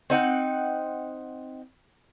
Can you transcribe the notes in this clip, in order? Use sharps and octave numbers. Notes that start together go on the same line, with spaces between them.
C4 D#4 F#5 G5